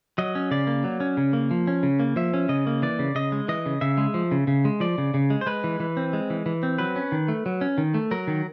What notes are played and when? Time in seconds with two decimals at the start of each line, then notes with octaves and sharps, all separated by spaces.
0.18 F#3 D#5
0.35 C#4
0.51 C#3 D5
0.67 A#3
0.84 F#3
1.00 C#4
1.17 C#3
1.33 A#3
1.51 F3
1.67 C#4
1.83 C#3
2.00 A#3
2.16 F3 E5
2.34 C#4
2.49 C#3 D#5
2.67 A#3
2.82 E3 D5
2.99 C#3
3.15 C#3 D#5
3.32 G#3
3.48 E3 D#5
3.66 C#3
3.81 C#3 E5
3.98 G#3
4.14 F3
4.31 C#3
4.47 C#3
4.65 G#3
4.80 F3 D5
4.98 C#3
5.14 C#3
5.30 G#3
5.41 C5
5.46 G#3 B4
5.64 E3
5.80 E3
5.97 C4
6.13 G#3
6.30 E3
6.46 E3
6.63 C4
6.79 F#3 B4
6.96 C#4
7.12 D#3
7.28 A3
7.46 F#3
7.61 C#4
7.78 D#3
7.94 A3
8.11 F#3 A#4
8.28 D#3